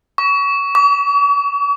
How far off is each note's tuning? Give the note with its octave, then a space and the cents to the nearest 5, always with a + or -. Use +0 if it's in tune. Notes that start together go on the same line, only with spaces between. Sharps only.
C#6 +25
C#6 +45